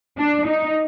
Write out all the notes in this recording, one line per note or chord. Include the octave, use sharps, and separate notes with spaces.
D4
D#4